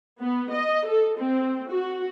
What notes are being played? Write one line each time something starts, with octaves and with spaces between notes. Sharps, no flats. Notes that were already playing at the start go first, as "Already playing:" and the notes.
B3
D#5
A4
C4
F#4